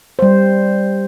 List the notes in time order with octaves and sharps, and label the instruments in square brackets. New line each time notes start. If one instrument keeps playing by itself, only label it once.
[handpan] G3 C5